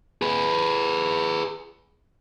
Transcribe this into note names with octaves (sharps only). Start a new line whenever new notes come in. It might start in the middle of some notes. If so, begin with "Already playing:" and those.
G#4 B4